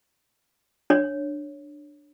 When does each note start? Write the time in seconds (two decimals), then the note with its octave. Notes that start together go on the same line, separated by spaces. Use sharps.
0.90 D4 C#5